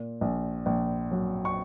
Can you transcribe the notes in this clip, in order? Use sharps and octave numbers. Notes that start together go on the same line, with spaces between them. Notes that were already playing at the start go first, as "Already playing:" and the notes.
Already playing: A#2
A#1
A#1
F#3
C#6